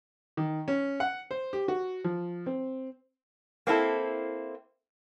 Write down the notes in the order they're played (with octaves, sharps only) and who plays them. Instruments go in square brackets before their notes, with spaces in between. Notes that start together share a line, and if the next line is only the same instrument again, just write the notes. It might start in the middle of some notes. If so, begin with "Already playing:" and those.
[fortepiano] D#3
C#4
F#5
C5
G4
F#4
F3
C4
[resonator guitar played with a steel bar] A#3 C4 E4 A4